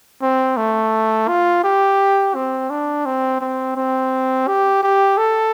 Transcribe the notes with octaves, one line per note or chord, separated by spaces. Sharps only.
C4
A3
F4
G4
C4
D4
C4
C4
C4
G4
G4
A4